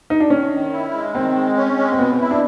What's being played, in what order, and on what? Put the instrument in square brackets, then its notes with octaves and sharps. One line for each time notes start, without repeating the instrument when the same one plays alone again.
[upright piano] D#4
D4
[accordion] D#3 [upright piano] C#4
[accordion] D#3
E4
G#3
[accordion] D#3 [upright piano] C4
[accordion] G#3
C#4
G#3
[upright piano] C4
[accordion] B2 [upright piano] B3
[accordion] E4
[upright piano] D4